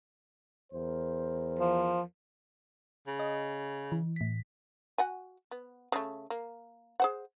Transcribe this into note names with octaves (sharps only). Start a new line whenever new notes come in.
E2 A#4 C5
F3
C#3
D#5
E3
A2 B6
F#4 F#5 G#5
B3
C#3 A3
A#3
G#4 C5 F#5